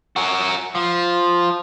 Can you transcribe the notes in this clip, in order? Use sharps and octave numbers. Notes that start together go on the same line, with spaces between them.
F#4 A#4
F3